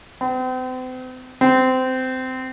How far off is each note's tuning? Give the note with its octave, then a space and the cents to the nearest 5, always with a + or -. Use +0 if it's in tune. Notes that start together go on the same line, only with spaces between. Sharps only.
C4 -40
C4 -20